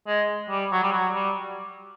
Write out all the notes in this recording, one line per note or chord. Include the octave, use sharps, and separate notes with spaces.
G#3
G3
F#3
G3
F#3
G3